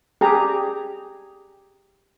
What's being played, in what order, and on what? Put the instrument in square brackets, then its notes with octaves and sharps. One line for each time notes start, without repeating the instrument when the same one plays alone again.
[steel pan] G4 G#4 A#5